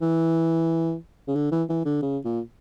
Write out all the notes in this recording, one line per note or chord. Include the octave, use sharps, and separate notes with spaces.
E3
C#3
D3
E3
E3
D3
C#3
A#2